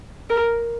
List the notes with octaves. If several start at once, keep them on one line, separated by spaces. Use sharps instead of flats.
A#4